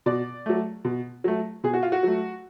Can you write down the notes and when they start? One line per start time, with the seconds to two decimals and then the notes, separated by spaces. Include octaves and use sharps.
0.06 B2 D5
0.46 F#3 A3
0.85 B2
1.24 F#3 A3
1.64 B2 G#4
1.74 F#4
1.83 F4
1.92 F#4
2.03 F#3 A3